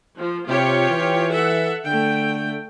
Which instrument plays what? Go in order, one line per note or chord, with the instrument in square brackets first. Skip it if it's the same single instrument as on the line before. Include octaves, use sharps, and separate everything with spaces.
[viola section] F3
[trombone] C3 [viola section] F4 G4 C#5
[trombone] E3
[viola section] A4 E5 F#5
[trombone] D3 [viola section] A3 G5